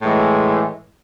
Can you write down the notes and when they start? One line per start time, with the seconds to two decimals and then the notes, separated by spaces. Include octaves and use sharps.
0.01 A2 E3 G#3